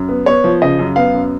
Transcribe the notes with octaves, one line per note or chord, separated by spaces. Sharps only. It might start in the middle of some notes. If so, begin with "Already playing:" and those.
Already playing: F#2
B3
B3 C#5
F3
C#3 D#5
F#2
B3 F5
F#2